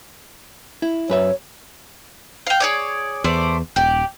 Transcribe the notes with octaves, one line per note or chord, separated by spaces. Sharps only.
E4
F#2 B4 C#5 E5
F5 G5
G#4 C#5 D5
E2 A3 C5 D5
D#1 G4 D5